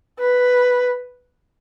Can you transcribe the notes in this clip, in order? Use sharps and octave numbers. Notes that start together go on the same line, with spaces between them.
B4